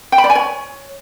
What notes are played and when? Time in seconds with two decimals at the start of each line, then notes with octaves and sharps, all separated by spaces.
0.12 G5
0.18 B5
0.24 D5
0.30 G#5
0.35 C#5